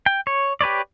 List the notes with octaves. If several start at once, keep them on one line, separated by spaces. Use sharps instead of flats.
G5
C#5
G4 B4 C#5 D5